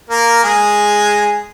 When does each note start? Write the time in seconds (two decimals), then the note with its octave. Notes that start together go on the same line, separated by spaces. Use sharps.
0.10 A#3 A#4
0.44 G#3 G#4